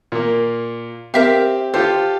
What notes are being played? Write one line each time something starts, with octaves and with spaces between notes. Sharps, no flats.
A#2 A#3
C4 G4 A#4 E5 F5
F4 G4 A4 C5